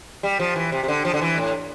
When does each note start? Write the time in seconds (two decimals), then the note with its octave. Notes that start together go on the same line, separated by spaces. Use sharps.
0.23 G3
0.40 F3
0.56 E3
0.72 C3
0.83 C3
0.88 D3
1.05 F3
1.14 D3
1.22 E3
1.38 A2